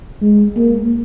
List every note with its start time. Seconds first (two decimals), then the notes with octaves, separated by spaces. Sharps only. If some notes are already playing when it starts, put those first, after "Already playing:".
0.22 G#3
0.56 A#3